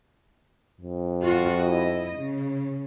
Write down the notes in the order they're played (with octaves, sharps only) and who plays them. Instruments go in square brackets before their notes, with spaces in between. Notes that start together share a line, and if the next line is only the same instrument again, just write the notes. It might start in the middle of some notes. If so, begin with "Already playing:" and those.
[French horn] F2
[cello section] F4 F#4
E4 D#5
C#3